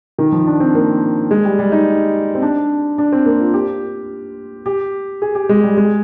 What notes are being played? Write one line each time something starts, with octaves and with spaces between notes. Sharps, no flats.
D#3
F3
D4
C4
A#3
G#3
G3
G3
D#4
C4
D4
D4
C4
A#3
F4
G4
G4
G#4
G4
G#3
G3
G#3